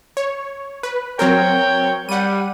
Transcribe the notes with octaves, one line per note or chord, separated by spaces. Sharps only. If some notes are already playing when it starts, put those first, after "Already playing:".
C#5
B4
F#3 C4 A#4 C#5 G5
G3 F#5 D#7